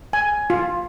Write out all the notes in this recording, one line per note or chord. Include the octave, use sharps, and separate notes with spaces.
G#5
F4